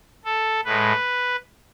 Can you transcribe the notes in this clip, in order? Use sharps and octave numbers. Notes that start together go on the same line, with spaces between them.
A4
A2 G#3 B4